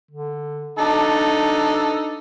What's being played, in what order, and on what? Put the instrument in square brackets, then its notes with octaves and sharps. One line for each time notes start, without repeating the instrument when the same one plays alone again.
[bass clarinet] D3
[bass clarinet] D4 [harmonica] D#4 A4